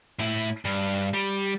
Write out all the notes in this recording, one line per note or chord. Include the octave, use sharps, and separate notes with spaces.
A2 E4
G2
G3